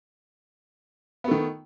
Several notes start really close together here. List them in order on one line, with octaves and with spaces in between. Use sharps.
B3 A3 D#3